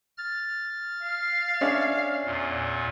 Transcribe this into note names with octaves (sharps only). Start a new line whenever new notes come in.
F6 A6
F5
C#4 D4 E5
E2 A#2